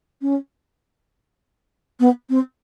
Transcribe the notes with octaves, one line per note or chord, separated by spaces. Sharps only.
C#4
B3
C4